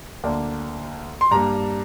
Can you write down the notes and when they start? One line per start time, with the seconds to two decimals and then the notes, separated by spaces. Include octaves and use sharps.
0.24 D2 D3 A#3 D4
1.21 C6
1.31 G2 G3 A#3 A#5